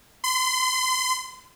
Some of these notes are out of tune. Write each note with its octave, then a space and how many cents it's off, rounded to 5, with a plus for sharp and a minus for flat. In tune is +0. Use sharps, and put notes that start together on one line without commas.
C6 -35